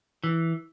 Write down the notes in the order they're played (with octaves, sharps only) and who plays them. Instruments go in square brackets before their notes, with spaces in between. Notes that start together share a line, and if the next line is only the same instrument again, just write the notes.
[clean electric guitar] E3